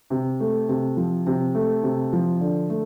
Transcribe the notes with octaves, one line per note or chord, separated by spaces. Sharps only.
C3
A3
C3
F3
C3
A3
C3
F3
D3
A3